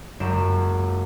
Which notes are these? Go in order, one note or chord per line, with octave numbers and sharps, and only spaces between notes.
F#1 C#2 F#2 D7 E7